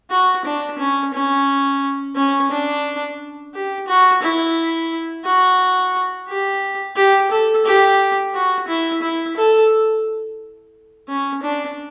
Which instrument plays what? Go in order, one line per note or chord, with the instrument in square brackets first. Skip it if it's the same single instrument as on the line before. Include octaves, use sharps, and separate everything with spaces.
[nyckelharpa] F#4
D4
C#4
C#4
C#4
D4
G4
F#4
E4
F#4
G4
G4
A4
G4
F#4
E4
E4
A4
C#4
D4